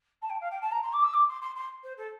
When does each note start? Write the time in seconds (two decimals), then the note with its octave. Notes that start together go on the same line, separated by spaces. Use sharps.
0.22 A5
0.30 G5
0.41 F5
0.51 G5
0.61 A5
0.72 A#5
0.83 C6
0.93 D6
1.04 E6
1.14 D6
1.28 C6
1.42 C6
1.56 C6
1.83 C5
1.97 A4